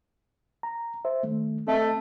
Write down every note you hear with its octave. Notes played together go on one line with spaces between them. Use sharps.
A#5
C5 E5
D#3 A3
A3 C4 D#5 E5